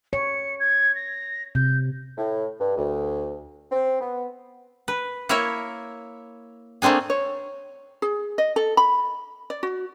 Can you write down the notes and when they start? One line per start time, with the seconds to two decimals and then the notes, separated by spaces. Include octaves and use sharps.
0.13 C#5 C#7
0.60 G#6
0.95 A#6
1.55 C3 G6
2.18 A2
2.59 G2
2.77 D2
3.72 C4
4.01 B3
4.88 B4
5.29 A#3 E4 A#4 C#5 E5
6.82 A3 A#3 C4 D4 G#4
7.10 C#5
8.02 G#4
8.38 D#5
8.56 A4
8.77 B5
9.50 D5
9.63 F#4